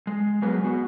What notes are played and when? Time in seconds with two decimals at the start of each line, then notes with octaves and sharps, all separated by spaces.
0.07 G#3
0.42 F#3 B3 G#4 A#4 B4
0.64 B3 F#4